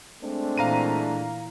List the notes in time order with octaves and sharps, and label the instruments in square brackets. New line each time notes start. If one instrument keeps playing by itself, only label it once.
[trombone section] G#3 A3 D4 [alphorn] C4
[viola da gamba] A#2 E3 [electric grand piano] F5 A#5 D#7